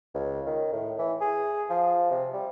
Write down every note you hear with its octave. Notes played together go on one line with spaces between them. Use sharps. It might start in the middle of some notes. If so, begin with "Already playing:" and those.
C#2
D#3
A2
E3
G#4
F3
C3
G3